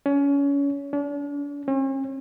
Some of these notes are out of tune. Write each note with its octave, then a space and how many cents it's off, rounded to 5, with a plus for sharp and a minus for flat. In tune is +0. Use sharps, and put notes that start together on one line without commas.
C#4 +25
D4 -40
C#4 -45